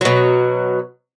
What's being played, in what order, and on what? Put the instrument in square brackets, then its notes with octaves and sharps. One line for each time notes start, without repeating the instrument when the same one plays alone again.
[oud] B2 F#3